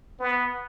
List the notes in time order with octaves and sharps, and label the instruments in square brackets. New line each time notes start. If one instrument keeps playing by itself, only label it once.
[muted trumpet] B3